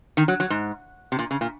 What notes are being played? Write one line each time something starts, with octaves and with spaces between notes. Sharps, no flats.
D#3
F#3
F#3
G#2
C3
A#2
C#3
A#2